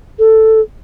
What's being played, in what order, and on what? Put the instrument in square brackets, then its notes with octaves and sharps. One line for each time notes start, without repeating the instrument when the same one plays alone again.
[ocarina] A4